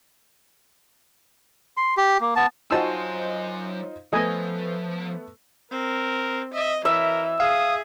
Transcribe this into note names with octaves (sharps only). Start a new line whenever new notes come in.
C6
G4
A#3
B3 A5
F#3 D#4 F4 F#4 C5 G#5 A5 E6
F3 A3 B3 D#5 G#5
C4 A#4
D#5 E5
E3 A#4 E5
G#4 F5 D#6